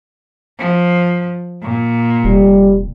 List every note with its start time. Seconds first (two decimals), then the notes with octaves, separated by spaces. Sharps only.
0.59 F3
1.63 A#2
2.24 F1 G3